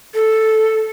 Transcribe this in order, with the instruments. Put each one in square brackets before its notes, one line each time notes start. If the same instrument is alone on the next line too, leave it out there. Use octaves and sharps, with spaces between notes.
[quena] A4